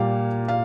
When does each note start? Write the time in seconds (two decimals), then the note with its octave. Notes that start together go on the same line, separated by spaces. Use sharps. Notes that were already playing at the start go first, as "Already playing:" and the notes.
Already playing: A#2 G3 A#3 F5
0.48 F5